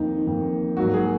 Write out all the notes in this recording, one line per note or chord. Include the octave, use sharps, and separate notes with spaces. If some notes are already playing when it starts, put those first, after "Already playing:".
Already playing: F2 D#3 A#3 D#4
F2 D#3 A#3
G#2 F#3 A#3 F#4
G#4